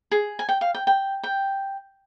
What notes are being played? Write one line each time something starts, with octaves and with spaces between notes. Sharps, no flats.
G#4
G#5
G5
F5
G5
G5
G5